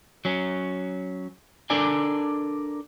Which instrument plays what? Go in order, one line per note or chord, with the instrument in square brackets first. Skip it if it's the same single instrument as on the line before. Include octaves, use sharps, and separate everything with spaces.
[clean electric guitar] F#3 C#4
D4 A4 A#4 D5 G#5